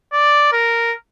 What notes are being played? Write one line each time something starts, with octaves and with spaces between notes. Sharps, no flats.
D5
A#4